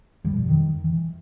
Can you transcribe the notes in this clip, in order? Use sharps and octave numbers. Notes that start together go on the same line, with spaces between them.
F#2 B2 F3 G3
F2 D#3
E3